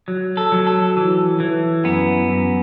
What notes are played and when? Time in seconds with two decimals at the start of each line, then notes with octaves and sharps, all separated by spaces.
0.08 F#3
0.37 A4
0.52 F#3
0.67 A4
0.97 E3
1.40 E3
1.84 F#2 B3
2.29 F#2